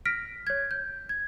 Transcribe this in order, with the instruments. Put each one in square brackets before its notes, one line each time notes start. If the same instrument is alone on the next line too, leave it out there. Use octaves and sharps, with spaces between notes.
[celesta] F6 A#6 B6 D7
C#5 G#6
G6
G#6